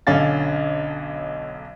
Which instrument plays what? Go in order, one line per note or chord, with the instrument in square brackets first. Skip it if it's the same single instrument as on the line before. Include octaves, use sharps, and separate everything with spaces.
[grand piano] B1 D3 C#4 F5 A6